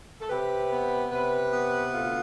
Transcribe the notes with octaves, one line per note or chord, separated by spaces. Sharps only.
A4
C3 G4 B4
B3
C3 G4 B4
B3
D2 F4 A4